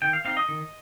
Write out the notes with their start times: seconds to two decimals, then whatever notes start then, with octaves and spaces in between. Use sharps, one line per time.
0.02 D#3 G5
0.13 F5
0.25 C4 D#4 F5
0.37 D#5
0.49 D#3